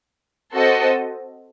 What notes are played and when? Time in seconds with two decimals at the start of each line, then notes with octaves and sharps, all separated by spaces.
0.54 C4 F#4 A4 C5 D#5